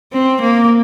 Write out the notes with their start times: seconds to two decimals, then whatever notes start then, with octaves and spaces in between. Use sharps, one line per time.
0.13 C4
0.42 A#3